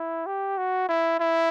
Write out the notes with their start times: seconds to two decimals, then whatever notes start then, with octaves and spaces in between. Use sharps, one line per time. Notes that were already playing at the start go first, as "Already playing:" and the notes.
Already playing: E4
0.26 G4
0.58 F#4
0.89 E4
1.20 E4